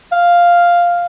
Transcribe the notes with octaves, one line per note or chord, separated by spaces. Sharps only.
F5